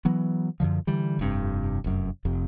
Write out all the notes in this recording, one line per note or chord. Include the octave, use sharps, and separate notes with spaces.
E3 F#3 B3
F#2 A2 D3 F3
D3 E3 G3
F1 G2 C3
F1 F#2
F1 F2 C3